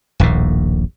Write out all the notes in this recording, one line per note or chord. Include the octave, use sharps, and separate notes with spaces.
D#1 A#1 D#2 A2